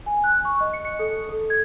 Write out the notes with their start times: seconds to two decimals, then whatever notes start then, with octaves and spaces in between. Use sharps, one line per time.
0.06 G#5
0.24 F#6
0.45 C#6
0.60 D#5
0.73 C#7
0.85 C#7
0.99 A4
1.29 A4
1.50 G#6